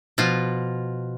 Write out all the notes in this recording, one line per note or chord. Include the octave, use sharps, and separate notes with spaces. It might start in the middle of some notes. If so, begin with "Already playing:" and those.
B2 F3 F4